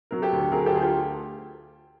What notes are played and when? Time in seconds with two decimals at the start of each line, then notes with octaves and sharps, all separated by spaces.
0.11 F#3 A#4
0.22 G4 A4
0.32 D2
0.52 F#3 G#4 A#4
0.66 G4 A4
0.72 D2 G#4
0.82 F4 G4